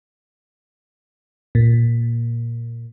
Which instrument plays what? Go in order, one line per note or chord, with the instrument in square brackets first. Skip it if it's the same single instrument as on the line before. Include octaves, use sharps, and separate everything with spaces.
[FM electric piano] A#2